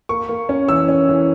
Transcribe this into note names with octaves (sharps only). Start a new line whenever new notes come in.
A#3 C#6
A#3
C#4
E3 E6
C#4
E3